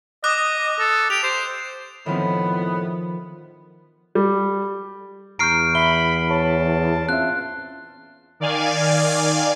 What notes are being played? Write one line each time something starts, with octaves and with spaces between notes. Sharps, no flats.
D#5 D6 D#6 F#6
A4
G4 F7
C5
A2 D#3 F3 B3 C4
G3
E2 A#5 C#6 F6 G6 C7 D7
E5 B5 G7
C#5 A5
C4 C#4 F4 E5 F#6
D#3 D5 F5 G#5